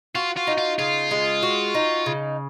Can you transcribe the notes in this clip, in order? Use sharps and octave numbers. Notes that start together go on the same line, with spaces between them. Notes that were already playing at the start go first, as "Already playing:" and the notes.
F4 F#4
F4
D#4
F4
C#3 F4
G#3
F#4
D#4
C#3